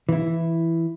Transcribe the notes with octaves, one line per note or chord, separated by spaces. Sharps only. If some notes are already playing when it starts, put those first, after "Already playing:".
E3 E4